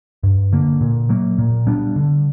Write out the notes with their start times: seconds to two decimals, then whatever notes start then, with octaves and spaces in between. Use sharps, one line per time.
0.23 G2
0.53 D3 A#3
0.81 A#2
1.09 F#3 A#3
1.38 A#2
1.67 G3 B3 D4
1.96 D3